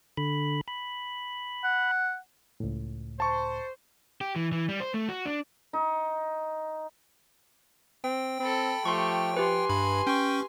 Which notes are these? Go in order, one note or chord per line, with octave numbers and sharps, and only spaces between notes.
D3 B5
B5
F#5
C#2 A2
C5 A5 C#6
G4
E3
E3
G3
C5
A3
F#4
D4
D#4
C4 G5
C4 A4 B5
F3 A3 G4 C6 C#6
G4 B4 G#5 C6
G2 B5
C#4 G5 C#6